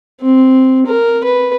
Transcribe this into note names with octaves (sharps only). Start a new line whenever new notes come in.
C4
A#4
B4